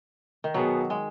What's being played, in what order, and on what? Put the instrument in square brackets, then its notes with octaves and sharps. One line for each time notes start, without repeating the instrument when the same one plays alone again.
[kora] D#3
[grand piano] B2 B3 G#4 [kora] F#3
[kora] G#3